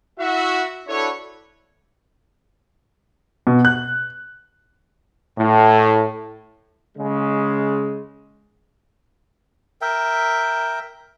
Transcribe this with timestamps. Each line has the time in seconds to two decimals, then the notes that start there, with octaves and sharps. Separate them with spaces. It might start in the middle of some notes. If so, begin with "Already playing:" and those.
0.19 E4 F#4 E5
0.88 D4 E4 F#4 A4 B4 C#5
3.47 B2
3.65 F#6
5.37 A2
6.97 C#3 G#3
9.81 A#4 E5 G5